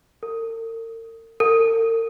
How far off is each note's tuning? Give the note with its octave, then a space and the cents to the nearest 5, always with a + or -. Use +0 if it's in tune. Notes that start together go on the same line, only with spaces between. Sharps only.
A#4 -45
A#4 -45